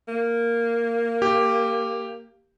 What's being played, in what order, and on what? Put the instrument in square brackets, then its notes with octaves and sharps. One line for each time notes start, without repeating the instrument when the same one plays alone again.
[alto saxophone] A#3
[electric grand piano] G4